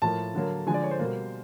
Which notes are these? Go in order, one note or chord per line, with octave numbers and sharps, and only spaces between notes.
A2 F3 A#3 A5
D3 F#3 A#3
D3 F3 G#3 G#5
D5
C#5
C5
B2 G3 A#3